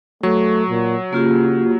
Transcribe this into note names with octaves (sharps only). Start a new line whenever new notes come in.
F#3 A3 C#6
A#2
C#3 A#3 F4 G4